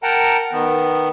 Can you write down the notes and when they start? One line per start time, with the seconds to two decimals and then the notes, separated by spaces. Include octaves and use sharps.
0.03 A#4 F#5 G5 A5 A#5
0.53 D#3 B3